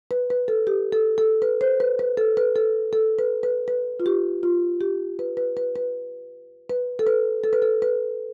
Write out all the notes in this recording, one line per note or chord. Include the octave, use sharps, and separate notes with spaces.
B4
B4
A4
G4
A4
A4
B4
C5
B4
B4
A4
B4
A4
A4
B4
B4
B4
F4
G4
F4
G4
B4
B4
B4
B4
B4
A4
B4
A4
B4
A4
B4